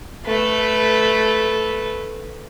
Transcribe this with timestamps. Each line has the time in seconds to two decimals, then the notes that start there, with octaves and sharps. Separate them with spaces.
0.25 A3 B4